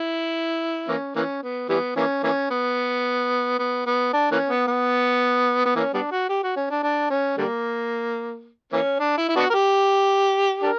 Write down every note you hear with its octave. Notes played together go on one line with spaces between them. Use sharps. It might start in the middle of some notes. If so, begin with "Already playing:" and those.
Already playing: E4
E3 A#3 C#4
E3 A#3 C#4
B3
E3 G3 B3
E3 A#3 C#4
E3 A#3 C#4
B3
B3
B3
D4
E3 A#3 C#4
B3
B3
B3
E3 A#3 C#4
G3 B3 D4
F#4
G4
F#4
C#4
D4
D4
C#4
D3 G3 A#3
E3 A#3 C#4
D4
E4
E4
B3 D4 F#4
A#4
G4
D4 G4 A#4